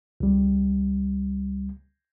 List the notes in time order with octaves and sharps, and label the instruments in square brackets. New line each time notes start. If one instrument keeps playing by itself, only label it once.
[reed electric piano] C#2 G3